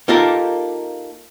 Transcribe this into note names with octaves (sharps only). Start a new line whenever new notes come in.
A#3 D#4 F4 G4 A4 A#4